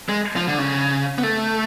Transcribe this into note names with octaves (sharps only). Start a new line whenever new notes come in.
G#3
F3
D3
C#3
B3
A3